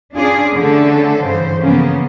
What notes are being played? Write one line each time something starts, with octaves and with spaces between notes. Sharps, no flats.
C#4 D4 F4 G#4 D5
D3 A3 C#4 A4
G2 C#3 E3 C5
C#3 F3 A#3 B3 C#4